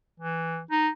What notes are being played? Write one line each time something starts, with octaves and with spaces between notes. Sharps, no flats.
E3
D#4